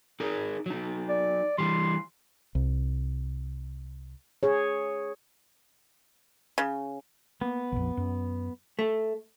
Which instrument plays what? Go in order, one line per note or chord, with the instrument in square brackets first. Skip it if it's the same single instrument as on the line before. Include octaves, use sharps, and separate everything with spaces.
[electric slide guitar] D#4 G#4 A#4
F#3 D#4
[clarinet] D5
[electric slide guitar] E3 G3 [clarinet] C6
[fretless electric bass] C2
[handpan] G#4 C#5
[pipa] C#3
[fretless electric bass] A#3 [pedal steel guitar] B3
[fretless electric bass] A#1 F2
F#2
[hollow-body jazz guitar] A3